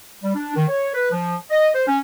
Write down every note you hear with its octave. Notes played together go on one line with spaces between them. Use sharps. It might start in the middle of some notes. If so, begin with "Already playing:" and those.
G3
D4
D#3
C#5
B4
F3
D#5
C5
C#4